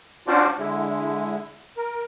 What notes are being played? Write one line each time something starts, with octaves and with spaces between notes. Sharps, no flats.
C#4 D4 F4 F#4 C5 D5
D3 G#3 E4
A#4